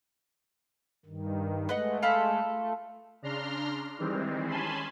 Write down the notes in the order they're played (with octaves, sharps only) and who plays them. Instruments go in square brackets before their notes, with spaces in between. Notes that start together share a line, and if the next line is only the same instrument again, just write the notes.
[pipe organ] G2 D#3
[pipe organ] G#3 A3 [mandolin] B4 D#5 F#5
[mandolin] F4 A4 B5
[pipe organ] A3
[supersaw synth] C#3 D4 A#5 C6 F6
D#3 E3 G3 G#3 C4
C#4 G#5 A5 B5 C6